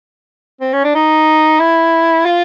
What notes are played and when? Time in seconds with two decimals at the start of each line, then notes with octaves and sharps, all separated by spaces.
0.61 C4
0.73 C#4
0.84 D4
0.95 D#4
1.60 E4
2.25 F4